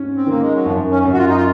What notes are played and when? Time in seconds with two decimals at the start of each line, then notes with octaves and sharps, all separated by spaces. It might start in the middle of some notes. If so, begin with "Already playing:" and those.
Already playing: G#2 C#4
0.17 C4
0.26 D#3 A#3
0.41 G#3
0.54 F#3
0.66 F#2 F3
0.91 C#4
1.05 F#2
1.13 F#4
1.18 F4
1.28 D#4
1.36 F4